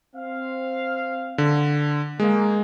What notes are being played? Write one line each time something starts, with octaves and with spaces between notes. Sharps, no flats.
C4 F5
D3
G#3 A#3